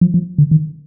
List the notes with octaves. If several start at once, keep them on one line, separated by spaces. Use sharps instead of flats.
F3
F3
D3
D#3